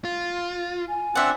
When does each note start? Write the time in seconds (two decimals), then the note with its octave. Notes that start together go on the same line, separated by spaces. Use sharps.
0.05 F4
0.89 G#5
1.15 C4 D4 E5 F#5